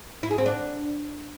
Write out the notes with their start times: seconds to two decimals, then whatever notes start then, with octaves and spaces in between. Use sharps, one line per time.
0.23 E4
0.31 G#4
0.38 C4
0.46 D4